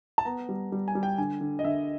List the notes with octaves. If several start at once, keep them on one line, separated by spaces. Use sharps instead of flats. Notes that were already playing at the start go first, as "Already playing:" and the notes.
A5
B3 A#5
G3
G3
G#5
G3
G5
D3 G#5
D3
D#5
D3 E5